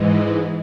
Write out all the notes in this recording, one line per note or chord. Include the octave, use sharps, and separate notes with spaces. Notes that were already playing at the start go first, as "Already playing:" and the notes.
Already playing: G#2 E3 G#3